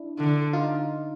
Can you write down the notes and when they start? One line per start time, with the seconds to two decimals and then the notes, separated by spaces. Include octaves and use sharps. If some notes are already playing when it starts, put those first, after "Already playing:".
Already playing: D4 E4
0.19 D3
0.53 D#4 F4